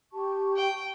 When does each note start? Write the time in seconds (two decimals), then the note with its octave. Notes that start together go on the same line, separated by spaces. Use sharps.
0.12 G4 A5 C#6
0.57 G5